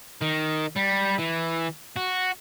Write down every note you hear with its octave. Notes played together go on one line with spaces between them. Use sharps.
D#3
G3
E3
F#4